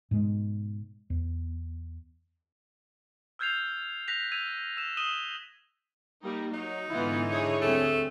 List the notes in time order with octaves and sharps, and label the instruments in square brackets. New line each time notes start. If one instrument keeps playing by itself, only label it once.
[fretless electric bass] G#2 B2 G#3
E2
[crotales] E6 F6 G6 G#6 C7 F7
F#6 A#6 B6 F7
E6 G#6 D#7 F7
E6 E7
D#6 D#7 E7 G7
[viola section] G3 A#3 D#4
[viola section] F#3 [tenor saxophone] D#4
[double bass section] G#2 D3 [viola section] E3 B3 F4 [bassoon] E4
[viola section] D4 G#4 C#5
[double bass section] D2 G3 C4 [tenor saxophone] A3